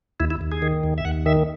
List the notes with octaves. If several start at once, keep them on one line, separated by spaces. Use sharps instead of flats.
D#2 E4
E4
D#2
G#4
D#3
D#2
E5
D#2 F#5
D#3 E5